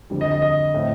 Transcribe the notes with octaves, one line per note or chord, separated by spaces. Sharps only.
F2 D3 G3
D#5
D#5
D#5
A2 A3 C4